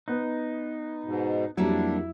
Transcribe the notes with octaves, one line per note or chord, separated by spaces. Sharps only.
B3 D#4 F#6
G#2 B2
F2 F#3 G3 A#3 D4 E4 F#4